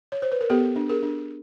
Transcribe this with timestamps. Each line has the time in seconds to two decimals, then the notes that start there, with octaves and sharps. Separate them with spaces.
0.12 C#5
0.22 C5
0.32 B4
0.41 A#4
0.50 B3 G4 A4
0.76 D4
0.89 G#4 A#4
1.03 D4